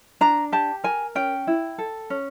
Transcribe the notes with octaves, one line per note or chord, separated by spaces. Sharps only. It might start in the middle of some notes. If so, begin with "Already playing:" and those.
D4 A#5
G4 A5
A#4 G#5
C#4 G5
E4
A4
C#4